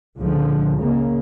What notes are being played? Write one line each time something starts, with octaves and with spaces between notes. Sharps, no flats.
C#2 A#2 D3 F3
C#3 A#3